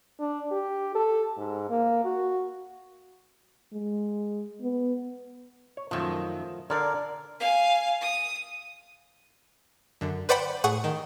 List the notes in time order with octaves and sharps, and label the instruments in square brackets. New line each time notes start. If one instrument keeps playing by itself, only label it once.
[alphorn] D4
G4
A4
G#2
A#3
F#4
G#3
B3
[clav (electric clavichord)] C#5
[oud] F#2 D#3 [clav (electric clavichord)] F3 A3
[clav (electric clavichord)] D3 A4 [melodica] A#4 [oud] C#5 D5 F5
[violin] F5 G#5
D#6
[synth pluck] F#2 D3
B4 C5 D5 F#5 G5 B5
A2 G#4 F#5 C#6 D#7
D#3